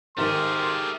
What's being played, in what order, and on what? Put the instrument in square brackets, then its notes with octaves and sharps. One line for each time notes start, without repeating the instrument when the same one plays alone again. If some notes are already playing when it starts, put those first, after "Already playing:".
[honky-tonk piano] G#1 D#3 [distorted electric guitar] A3 G#4 [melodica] G4 A#4 [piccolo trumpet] C6